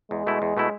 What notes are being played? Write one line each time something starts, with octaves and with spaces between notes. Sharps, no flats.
E2 G#3
B2 A3 E4
E2
B2 A3 E4